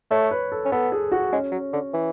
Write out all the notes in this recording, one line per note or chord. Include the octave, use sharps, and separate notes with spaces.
A3 C#5
B4
A4
C#4
B3 A4
G#4
F#4
G#3 C#4
F#3
D3
E3